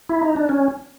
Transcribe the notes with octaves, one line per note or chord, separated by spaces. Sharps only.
E4
D#4
D4
C#4